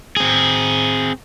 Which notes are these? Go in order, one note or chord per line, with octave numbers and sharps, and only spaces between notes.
C4 G#4